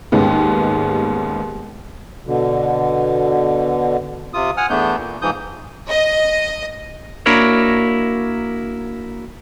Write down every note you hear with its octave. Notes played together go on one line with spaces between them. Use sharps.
D#2 G#2 G3 G#3 B3 C#4
B2 D3
C3 F4 D#6
F#5 G#5 D#6 F6
E2 A3 B3 D4 G6
A#2
G#2 E3 F3 D#6 G6
D#5
A#3 D4 E4 F#4 A#4 C#5